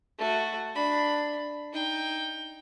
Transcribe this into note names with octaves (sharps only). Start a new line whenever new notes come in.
A3 F#4
D4 B5
D#4 G5